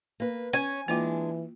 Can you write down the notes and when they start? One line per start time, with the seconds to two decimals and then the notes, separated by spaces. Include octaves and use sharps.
0.20 A#3 B4
0.53 C#4 C#5 G#5
0.88 E3 G#3 A#3 D4 F4